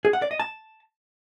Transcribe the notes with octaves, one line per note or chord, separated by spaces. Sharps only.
G#4
F#5
D5
D#5
A5